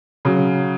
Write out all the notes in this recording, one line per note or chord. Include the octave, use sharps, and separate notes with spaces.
C#3 F#3